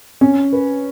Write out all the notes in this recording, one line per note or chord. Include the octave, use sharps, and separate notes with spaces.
C#4
B4